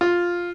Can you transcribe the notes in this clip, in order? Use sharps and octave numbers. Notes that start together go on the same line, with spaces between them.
F4